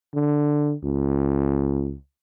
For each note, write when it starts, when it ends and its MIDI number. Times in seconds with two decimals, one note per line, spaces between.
0.14 0.74 50
0.84 1.96 37